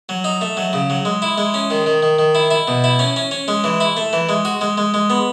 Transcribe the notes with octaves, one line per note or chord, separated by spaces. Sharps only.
F#3
D#4
A3
F#3
C#3
F#3
G#3
E4
G#3
C#4
D#3
D#3
D#3
D#3
E4
E4
B2
E4
C#4
C#4
C#4
G#3
E3
E4
A3
E3
G#3
F#4
G#3
G#3
G#3
B3